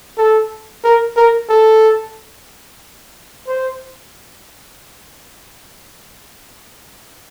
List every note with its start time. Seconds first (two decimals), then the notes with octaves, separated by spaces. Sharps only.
0.18 A4
0.84 A#4
1.17 A#4
1.49 A4
3.48 C5